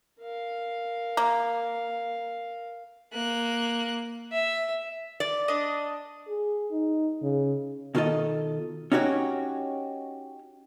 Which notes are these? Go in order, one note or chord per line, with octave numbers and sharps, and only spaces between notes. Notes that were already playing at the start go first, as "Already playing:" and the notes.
A#4 F5
A#3
A#3 F#6
E5
D5
D4 D#5
G#4
D#4
C#3
B2 D#3 F4 A4 D#5
C#4 D#4 F#4 G4 C#5